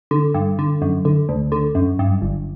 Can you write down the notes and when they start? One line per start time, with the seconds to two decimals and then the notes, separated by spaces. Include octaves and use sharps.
0.11 D3
0.34 G2
0.59 D3
0.82 F#2
1.05 D3
1.29 D2
1.52 D3
1.75 F#2
1.99 G2
2.22 G1